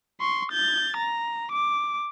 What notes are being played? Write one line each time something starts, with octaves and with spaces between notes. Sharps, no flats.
C6 C#6
G6 A6
A#5
D6